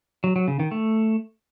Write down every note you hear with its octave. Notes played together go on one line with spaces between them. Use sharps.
F#3
F#3
C#3
D#3
A3